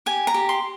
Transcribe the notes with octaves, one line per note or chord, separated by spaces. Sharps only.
G4 G#5
A#5
G4
C6